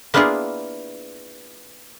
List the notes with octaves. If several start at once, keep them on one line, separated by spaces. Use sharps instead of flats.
A#3 B3 D4 E4 F4 G#4